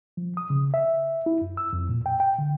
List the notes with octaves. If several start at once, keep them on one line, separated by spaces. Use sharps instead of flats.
F3
D#6
C#3
E5
E4
F#2
E6
F2
A#2
G5
G5
D3